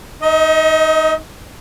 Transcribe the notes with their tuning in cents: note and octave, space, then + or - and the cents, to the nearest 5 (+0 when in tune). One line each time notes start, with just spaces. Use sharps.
D#4 +0 D#5 +35